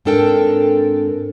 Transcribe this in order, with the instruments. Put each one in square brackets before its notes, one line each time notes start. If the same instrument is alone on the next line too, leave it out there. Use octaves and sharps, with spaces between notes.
[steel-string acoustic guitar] G#2 C4 D4 A4 A#4 G5